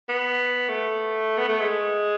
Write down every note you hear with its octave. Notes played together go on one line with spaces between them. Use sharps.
B3
A3
B3
A3
G#3